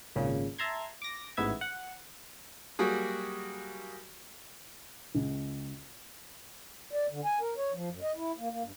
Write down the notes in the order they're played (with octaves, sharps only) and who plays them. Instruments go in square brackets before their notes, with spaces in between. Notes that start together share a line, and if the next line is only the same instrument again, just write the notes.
[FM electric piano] G#1 A#2 C#3
E5 A5 A#5 C6 G#6
D6 A#6
A1 G#2 B3 E5 G#6
F#5
[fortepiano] F#3 G3 A#3 F#4 G#4
[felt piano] C#2
[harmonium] D5
D3
G#5
A#4
C#5
F3
F#2
D#5
E4
A#3
A#3
G2